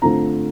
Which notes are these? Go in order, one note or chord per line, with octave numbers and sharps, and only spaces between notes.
D3 A3 C4 F4 A#5